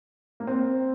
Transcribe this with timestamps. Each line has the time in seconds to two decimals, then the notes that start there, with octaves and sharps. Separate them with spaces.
0.40 A#3
0.47 C4